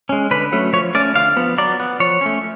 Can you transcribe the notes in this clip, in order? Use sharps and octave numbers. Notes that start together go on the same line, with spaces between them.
G#3 C#4
D3 B4
F#3 A3 C#4
F3 C#5
A3 C#4 D5
D3 F5
F3 B3
F#3 D5
B3
F3 C#5
A3 C#4